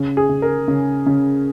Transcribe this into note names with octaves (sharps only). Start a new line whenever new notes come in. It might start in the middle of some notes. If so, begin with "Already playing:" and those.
Already playing: C#3
G#4
C#3
A#4
C#3
C#3